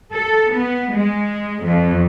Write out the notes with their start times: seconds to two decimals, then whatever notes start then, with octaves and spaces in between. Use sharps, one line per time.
0.12 A4
0.52 B3
0.93 G#3
1.64 F2